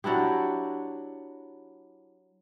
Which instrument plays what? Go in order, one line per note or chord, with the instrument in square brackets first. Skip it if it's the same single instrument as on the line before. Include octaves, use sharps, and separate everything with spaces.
[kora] F#3 D4 E4 G4